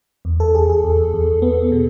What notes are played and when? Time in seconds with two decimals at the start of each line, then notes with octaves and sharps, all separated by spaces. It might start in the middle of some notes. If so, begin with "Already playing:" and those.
0.25 E2
0.40 A4
0.54 E2 G#4
0.70 G#4
0.84 E2
1.14 E2
1.42 B3
1.72 B2